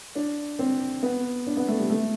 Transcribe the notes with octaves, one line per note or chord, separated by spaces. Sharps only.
D4
C4
B3
D4
B3
A3
G3
A3